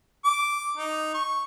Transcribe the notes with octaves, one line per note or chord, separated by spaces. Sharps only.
D6
D#4
C#6